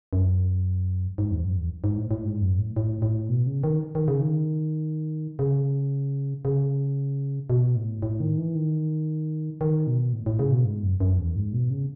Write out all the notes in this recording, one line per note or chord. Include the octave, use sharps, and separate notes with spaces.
F#2
G#2
E2
F#2
E2
G#2
A2
A2
G#2
F#2
A2
A2
A2
B2
C#3
D#3
D#3
C#3
D#3
C#3
C#3
B2
A2
A2
D#3
E3
D#3
D#3
B2
A2
A2
C#3
B2
G#2
F#2
F#2
E2
G#2
B2
C#3